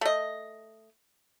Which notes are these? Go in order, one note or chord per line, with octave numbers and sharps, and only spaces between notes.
A3 D#5